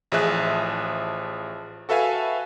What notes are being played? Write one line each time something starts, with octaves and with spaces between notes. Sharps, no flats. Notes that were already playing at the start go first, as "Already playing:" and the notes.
A1 F3 G#4 E5 F#6
F#4 A4 B4 E5 F5 G#5